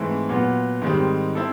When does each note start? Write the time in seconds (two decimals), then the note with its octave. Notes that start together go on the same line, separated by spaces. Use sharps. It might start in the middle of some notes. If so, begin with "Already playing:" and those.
Already playing: G#2 E3 A3 C4
0.29 A#2 F#3 B3
0.82 G#2 D#3 G3 C4
1.35 C4 E4 A4